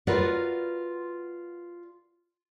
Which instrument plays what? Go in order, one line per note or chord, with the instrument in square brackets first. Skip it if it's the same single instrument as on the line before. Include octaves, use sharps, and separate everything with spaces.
[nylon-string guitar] F4 F#4 A#4 B4 D5 F#5